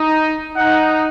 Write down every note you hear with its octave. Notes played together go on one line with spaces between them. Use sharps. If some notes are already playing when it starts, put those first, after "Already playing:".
Already playing: D#4
D#4 F#5